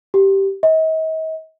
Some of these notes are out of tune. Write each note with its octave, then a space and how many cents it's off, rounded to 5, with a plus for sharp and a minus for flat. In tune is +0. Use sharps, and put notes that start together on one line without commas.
G4 -10
D#5 +40